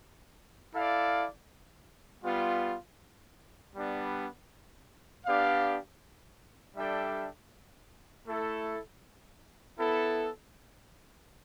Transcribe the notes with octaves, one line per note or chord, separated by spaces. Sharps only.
E4 A4 D5 F5
G3 B3 F4
G3 B3 D4
B3 D4 G4 D5 F5
G3 D4 A4 E5 G5
A3 E4 A4
B3 E4 A4